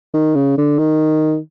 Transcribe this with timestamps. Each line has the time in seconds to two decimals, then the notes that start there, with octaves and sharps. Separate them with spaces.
0.14 D#3
0.35 C#3
0.58 D3
0.78 D#3